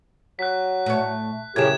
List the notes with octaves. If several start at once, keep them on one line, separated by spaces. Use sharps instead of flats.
F#3 F#6 B6
A2 C#5
F#2 A2 C#3 G4 G#4 A#4 G#6 E7